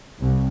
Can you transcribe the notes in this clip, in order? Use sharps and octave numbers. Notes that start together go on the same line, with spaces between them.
C2